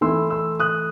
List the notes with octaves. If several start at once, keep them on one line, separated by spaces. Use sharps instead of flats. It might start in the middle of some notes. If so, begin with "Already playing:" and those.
E3 A3 E4 C6 E6
C6 E6
D#6 F#6